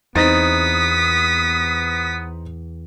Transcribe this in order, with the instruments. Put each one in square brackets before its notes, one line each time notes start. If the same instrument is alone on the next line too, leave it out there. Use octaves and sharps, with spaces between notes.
[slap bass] E2 [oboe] B3 [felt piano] C4 D#4 A6 [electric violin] D#6 B6